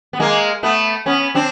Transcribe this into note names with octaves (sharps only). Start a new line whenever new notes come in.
B3
G#3 A#3
A3 B3
B3 C#4
C4 D4